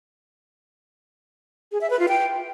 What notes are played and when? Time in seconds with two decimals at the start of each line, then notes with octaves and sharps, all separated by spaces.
1.72 G#4
1.81 E5
1.90 B4
1.99 F4
2.08 G5